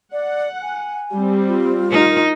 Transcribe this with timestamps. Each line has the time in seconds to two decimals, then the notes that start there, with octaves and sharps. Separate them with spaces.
0.12 D5 F#5
0.62 G#5
1.13 G3 C4
1.48 F4
1.91 D#4 A#4